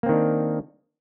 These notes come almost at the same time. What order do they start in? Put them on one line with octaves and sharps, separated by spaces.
A#3 C4 D#3 D4